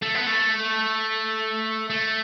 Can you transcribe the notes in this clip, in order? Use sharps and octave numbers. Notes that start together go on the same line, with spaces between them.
A3
B3
A3
A3